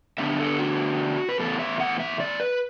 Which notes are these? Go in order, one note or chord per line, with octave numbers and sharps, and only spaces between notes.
D3 B3 D4 E5
A4
F#4
B4
A2 E3 B3 A4
E5
F#5
E5
D5
B4